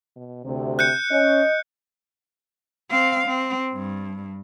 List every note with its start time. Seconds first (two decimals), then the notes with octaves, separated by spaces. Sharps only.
0.16 B2
0.45 D2 C3
0.79 F#6 G6 C#7
1.11 C#4 D#5
2.91 C4 F5
3.27 C4
3.73 G2